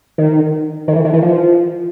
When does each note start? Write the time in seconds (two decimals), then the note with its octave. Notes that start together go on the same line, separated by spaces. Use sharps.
0.18 D#3
0.88 D#3
0.95 E3
1.05 D#3
1.14 E3
1.22 F3